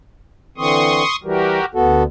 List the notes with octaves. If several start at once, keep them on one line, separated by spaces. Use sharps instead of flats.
D3 E3 C4 C6 C#6 D#6
E3 G3 F#4 G4 A#4
D2 B3 F#4 A4